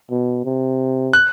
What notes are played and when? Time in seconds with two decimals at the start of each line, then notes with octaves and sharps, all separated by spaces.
0.11 B2
0.44 C3
1.13 F#6